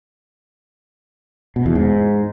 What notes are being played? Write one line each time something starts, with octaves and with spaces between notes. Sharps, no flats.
B2
E2
G#2